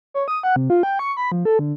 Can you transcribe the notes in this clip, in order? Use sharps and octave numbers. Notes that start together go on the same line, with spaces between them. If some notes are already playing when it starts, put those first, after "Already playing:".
C#5
D#6
F#5
C3
F4
G5
C#6
B5
F3
A4
D3